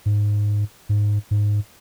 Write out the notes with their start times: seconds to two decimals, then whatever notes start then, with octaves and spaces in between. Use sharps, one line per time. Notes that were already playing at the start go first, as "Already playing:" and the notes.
0.06 G#2
0.89 G#2
1.31 G#2